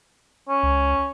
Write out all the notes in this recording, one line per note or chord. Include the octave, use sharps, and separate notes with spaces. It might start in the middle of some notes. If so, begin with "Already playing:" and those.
C#4
C#2